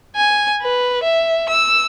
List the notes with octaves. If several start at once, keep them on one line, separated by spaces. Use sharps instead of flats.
G#5
B4
E5
E6